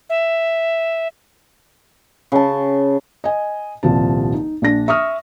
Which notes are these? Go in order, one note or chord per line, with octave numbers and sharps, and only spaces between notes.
E5
C#3 A5
D#5 G#5
D#1 C2 F3 A5
D#4
A#1 D4 A#6
E5 C#6 D#6 F6